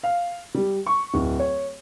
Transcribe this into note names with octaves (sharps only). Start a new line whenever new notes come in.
F5
G3
C#6
D1
C#5